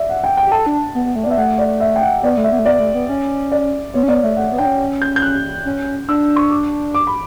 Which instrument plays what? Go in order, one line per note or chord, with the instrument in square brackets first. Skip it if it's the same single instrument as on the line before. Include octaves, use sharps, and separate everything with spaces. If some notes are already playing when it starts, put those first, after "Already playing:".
Already playing: [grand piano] D5 E5
F#5
G5
G5
[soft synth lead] G4
[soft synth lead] A4 [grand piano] A5
[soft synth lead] D4
B3
B3
A3
[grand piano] D5
[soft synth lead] B3
[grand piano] E5
[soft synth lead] A3 [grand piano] F#5
[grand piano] D5
E5
G5
F#5
[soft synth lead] B3 [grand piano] D5
[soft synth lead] A3
[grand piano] E5
[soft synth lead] B3
A3
[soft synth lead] B3 [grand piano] D5
[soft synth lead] A3
B3
C#4
[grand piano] D5
[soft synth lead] B3 [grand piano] C#5
[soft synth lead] C#4
[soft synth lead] B3 [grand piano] D5
[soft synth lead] A3 [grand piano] E5
[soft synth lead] A3 [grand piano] F#5
[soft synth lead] B3
[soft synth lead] D4 [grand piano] G5
[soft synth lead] C#4
[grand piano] G6
G6
F#6
[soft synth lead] C#4
[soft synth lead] D4 [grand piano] E6
[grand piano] C#6
D6
D6
B5